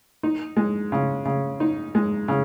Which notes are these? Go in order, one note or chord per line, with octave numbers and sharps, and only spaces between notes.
D#4
G#3
C#3
C#3
D#4
G#3
C#3